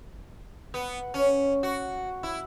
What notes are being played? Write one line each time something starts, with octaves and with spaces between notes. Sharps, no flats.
B3
C#4
F#4
E4